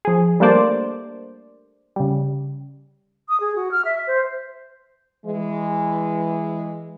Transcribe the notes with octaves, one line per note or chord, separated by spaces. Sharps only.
F3 G#4
G3 A3 A#3 D4 C5 D5
C#3 G3
D#6
G#4
F#4
F6
E5
C5
E3 G#3